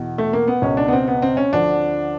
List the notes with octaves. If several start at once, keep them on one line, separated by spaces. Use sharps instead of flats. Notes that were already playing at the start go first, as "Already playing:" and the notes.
Already playing: E2 B2
A3
A#3
B3
C#2 B2 C#4
D4
B3
C4
B3
C4
C#4
D2 D3 F3 D4